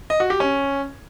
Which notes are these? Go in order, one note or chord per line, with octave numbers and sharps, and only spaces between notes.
D#5
F#4
G4
C#4